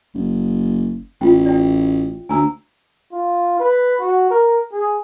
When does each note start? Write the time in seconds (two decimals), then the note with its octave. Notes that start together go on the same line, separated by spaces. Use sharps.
0.14 F#1
1.21 A1 F4 G5
1.46 D5 E5 G5
2.29 D2 G#5 A#5 E6
3.13 F4
3.59 B4
4.00 F#4
4.31 A#4
4.72 G#4